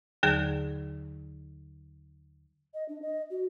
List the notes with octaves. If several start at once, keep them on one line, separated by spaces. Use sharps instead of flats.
D#2 D3 F#3 G#4
D#5
D4
D#5
F#4